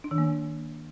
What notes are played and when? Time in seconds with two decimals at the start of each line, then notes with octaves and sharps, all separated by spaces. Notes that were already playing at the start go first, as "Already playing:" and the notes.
0.04 D4
0.11 D#3
0.18 A#3